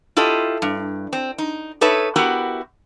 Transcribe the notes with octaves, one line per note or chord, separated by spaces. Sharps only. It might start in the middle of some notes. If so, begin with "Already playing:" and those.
E4 F4 G4 A4 D#5
G2
C4
D#4
D#4 A4 B4 C#5 E5
B3 E4 F#4 G4 A#4